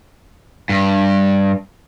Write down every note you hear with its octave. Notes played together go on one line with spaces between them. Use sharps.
G2